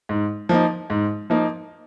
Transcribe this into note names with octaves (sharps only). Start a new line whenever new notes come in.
G#2
F3 A#3 D#4
G#2
F3 A#3 D#4